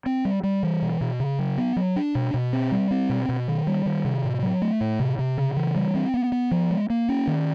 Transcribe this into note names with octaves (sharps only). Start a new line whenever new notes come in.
C4
G3
G3
E3
B2
B2
C#3
F#3
B3
F#3
D4
B2
B2
C4
G3
C4
B2
B2
D#3
G3
D#3
C3
A2
F#3
A3
A2
C3
C3
C#3
E3
G3
C4
B3
B3
F3
G#3
A#3
C#4
D#3